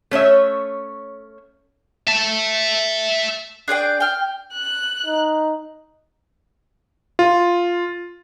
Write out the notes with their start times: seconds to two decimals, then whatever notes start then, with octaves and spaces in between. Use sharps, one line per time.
0.11 A3 C#4 C#5 E5
2.07 E5 A5
3.68 D4 G#4 D5 G5
4.00 G5 F6
4.54 F#6
5.07 D#4
7.19 F4